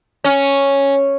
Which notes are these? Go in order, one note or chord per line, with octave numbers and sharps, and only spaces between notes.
C#4